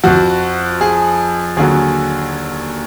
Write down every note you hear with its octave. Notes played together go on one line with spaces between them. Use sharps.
F2 F3 F#4
G#4
D#2 D3 F#3 G#4